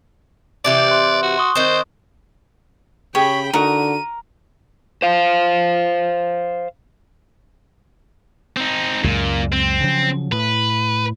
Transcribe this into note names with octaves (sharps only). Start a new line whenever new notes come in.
C3 E3 G4 D5
C6 F#6
F#4
C6 C#6 D#6
D#3 C4 C5
C#3 G4 G#4 C#5 G5 B5
D3 D#4 F#4 A#4 D#7
C5 F5
C4 D#4
C#2 F#2 A#2 G#3
C4
C#3 F3 F#3
A2 B4